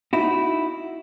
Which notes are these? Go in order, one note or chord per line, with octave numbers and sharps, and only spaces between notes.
D#4 E4 F#4